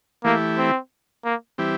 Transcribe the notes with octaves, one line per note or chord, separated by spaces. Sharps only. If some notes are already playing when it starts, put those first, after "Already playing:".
E3 A3 A#3 E4 G4
C4
A#3
E3 G3 C4 E4 G4